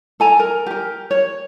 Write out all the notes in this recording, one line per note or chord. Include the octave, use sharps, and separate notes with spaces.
A4 G#5 A#5
A#4
G4 A#4
C#5